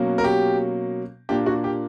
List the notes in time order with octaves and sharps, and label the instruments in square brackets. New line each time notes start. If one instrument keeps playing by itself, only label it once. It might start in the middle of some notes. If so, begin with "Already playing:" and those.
Already playing: [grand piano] B2 F#3 A#3 C#4
A#4
G4
A#2 A#3 D4 G4
F#4
G4